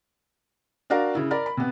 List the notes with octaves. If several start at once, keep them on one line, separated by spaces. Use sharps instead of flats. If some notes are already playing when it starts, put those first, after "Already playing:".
D4 F#4 A#4 F5
C#3 E4
A#4 D5 B5
B5
C3 B3